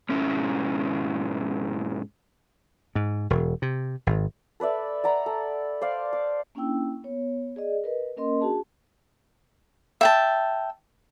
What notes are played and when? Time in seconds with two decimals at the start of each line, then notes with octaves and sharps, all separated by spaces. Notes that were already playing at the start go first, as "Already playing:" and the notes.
0.09 G#2 B2 C#4 E4
2.95 G#2
3.30 E1
3.62 C3
4.07 G#1
4.60 A4 B4 D5 E5
5.04 D5 F#5 A#5 B5
5.26 A4
5.81 C5 D5 F5
6.13 D6
6.55 A#3 C#4 D4 E4 G5 E6
7.04 B3 C#5
7.56 G#4 D5 D#5
7.84 A#4 B4 D#5
8.17 A#3 C#4 A#4 D#5 C6
8.41 D4 F#4 G#4 A5
10.01 E5 G5 A5